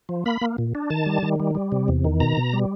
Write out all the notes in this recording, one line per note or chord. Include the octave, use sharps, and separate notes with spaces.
F3
A#3 B5
A#3
A#2
D4
D#3 A5
G3
D#3
G3
G3
C3
E2
D#3
B2 A#5
B2
G3